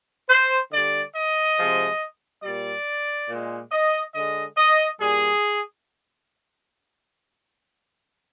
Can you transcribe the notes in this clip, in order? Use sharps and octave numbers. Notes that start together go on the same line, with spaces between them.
C5
D3 G3 D5
D#5
C3 F3 G#3
A#2 G3 D5
A#2 G#3
D#5
D3 G#3 D#5
D#5
A#2 G3 G#4